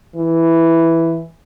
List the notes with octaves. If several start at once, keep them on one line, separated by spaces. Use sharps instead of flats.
E3